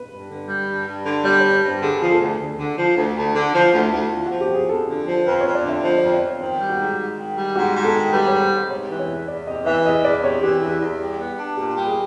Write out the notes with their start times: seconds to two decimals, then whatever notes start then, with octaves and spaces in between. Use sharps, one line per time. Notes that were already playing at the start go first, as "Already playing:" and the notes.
Already playing: B4
0.10 G2
0.29 D3
0.48 G3
0.68 G2
0.87 G2
1.06 D3
1.25 G3 D5
1.39 G2 C#5
1.54 C#5
1.63 G2
1.68 C5
1.82 D3 G#4
1.97 F3 G#4
2.11 A4
2.20 D2
2.39 D2
2.59 D3
2.78 F3
2.97 D2
3.16 D2
3.35 D3
3.54 F3 F4
3.74 D2
3.83 E4
3.93 D2
4.12 D3 F4
4.26 F#4
4.31 F3
4.41 G4
4.50 F2 G#4
4.69 F2 A4
4.88 D3
5.07 F3
5.27 F2 B4
5.41 F2 C#5
5.55 D5
5.65 D3 E5
5.84 F3 D#5
5.98 D5
6.03 F2
6.13 D5
6.22 F2
6.27 C#5
6.41 D#3 C5
6.60 G3
6.70 F#4
6.80 G#2
6.99 G#2
7.18 D#3
7.37 G3
7.56 G#2 F#4
7.75 G#2
7.85 A4
7.95 D#3
8.13 G3 B4
8.27 G#2 C#5
8.42 C5
8.52 G#2 C5
8.71 C3 C#5
8.90 E3
8.99 C#5
9.08 E2
9.28 E2 D5
9.47 C3 D#5
9.66 E3 E5
9.85 E2 D#5
10.04 E2 D5
10.24 C3 C#5
10.43 E3 G4
10.62 E2
10.81 E2
11.00 G3
11.19 B3
11.39 D4
11.57 A#2 G4
11.77 G3
11.86 G#4